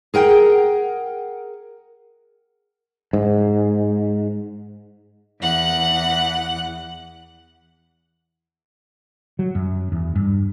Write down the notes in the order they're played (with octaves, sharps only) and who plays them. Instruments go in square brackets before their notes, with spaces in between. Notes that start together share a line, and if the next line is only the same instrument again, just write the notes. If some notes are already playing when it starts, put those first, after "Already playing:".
[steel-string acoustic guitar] G#4 A#4 F#5 G5
[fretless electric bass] G#2
[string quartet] E2 F#5 F#6
[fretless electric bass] F#3
F#2
E2
G2